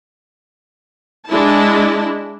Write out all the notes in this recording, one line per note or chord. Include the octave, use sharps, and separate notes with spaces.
G#3 D4 E4 A5